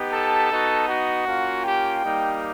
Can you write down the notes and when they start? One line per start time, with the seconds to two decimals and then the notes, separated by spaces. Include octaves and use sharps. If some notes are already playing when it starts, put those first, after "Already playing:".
Already playing: B3 D#4 G4
0.12 A4 A5
0.50 B3 D#4 F#4
0.88 F#4 F#5
1.26 A#3 C#4 F4
1.64 G4 G5
2.02 G3 A#3 D#4 G4